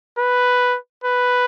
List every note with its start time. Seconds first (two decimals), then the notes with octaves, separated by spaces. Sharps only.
0.18 B4
1.04 B4